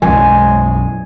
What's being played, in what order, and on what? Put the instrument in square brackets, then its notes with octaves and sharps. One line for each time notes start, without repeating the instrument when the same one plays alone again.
[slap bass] B1 F#2 E3 [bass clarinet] G#3 [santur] G#5